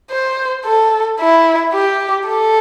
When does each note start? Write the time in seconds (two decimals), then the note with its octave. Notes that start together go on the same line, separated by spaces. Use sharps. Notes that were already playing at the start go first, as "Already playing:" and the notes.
0.11 C5
0.65 A4
1.20 E4
1.74 G4
2.28 A4